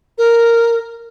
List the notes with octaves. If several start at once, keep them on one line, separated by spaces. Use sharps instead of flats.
A#4